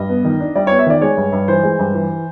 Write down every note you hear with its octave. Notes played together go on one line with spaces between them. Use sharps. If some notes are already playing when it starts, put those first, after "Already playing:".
Already playing: G2 D#5
B3
D#3
D4
G3 D5
B3 C#5
E5
D#3 D5
G#3 C#5
G2
G2
E3 C5
G#3
G2
E3